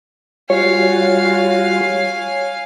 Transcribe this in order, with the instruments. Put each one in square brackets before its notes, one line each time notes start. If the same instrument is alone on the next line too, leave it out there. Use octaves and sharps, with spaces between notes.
[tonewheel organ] G3 F4 F#4 [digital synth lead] C#5 [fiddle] F5 G#5